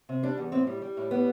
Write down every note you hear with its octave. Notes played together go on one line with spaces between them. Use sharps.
C3
G3 D4
E2
A2 C4
G3
G3
A2
G3 B3